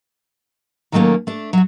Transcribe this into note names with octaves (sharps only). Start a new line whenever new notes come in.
D#3 F#3 G3 A3 A#3 C#4
A3 D4
F#3 F#4